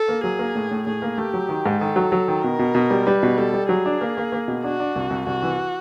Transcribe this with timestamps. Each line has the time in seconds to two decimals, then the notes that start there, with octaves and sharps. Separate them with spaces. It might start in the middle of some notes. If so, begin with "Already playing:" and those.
Already playing: A4
0.08 A#3
0.24 F#3 G#4
0.39 A#3
0.55 A2
0.71 A2
0.87 A2 G#4
1.02 A#3
1.18 A3 G4
1.34 F#3
1.49 D#3
1.66 G#2
1.80 D#3 A4
1.96 F#3
2.12 F#3
2.28 D#3
2.44 B2 A#4
2.59 B2
2.75 B2
2.90 G3
3.06 G3 B4
3.23 B2
3.38 G3 A4
3.54 G3
3.69 F#3 G#4
3.86 D4
4.01 A#3
4.17 A#3
4.32 A#3
4.48 B2
4.63 D4 F#4
4.80 D4
4.96 C2
5.10 C2
5.26 C2 F#4
5.42 E3